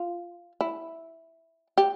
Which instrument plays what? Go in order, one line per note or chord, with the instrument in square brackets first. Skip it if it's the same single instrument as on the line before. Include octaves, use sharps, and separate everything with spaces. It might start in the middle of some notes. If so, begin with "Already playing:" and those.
Already playing: [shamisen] F4
E4
G4